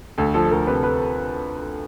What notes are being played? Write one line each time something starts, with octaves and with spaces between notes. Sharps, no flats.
D2 A4
F3 A4
A4
D2 A#4
C3 B4
B4